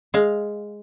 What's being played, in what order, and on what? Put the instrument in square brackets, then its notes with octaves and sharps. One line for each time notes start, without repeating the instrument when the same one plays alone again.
[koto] G#3 F5